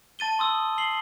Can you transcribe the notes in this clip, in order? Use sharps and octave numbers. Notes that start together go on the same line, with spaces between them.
A5 A6 D#7 G7
C6 D#6 E6
C7 F#7 G7